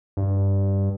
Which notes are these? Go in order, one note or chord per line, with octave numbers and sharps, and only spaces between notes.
G2